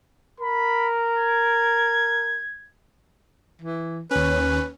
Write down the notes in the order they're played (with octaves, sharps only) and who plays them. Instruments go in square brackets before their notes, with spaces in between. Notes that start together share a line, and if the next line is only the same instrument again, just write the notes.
[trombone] A#4 [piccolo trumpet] B5
[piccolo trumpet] G#6
[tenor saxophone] E3
[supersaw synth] D#2 C#4 [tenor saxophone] B4